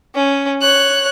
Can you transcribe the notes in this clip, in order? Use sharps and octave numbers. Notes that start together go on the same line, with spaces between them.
C#4
C#5 F#6